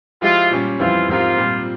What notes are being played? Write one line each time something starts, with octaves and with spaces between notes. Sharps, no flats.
F3 G#3 E4 F4 G4
A#2 G3 C#4
F2 E3 G3 C4 E4 F4
G#2 F3 C4 F4 G4 A#4
A#2 G3 C4